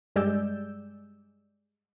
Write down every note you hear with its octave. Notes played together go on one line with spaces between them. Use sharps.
G2 G3 G#3 D5 E6 G6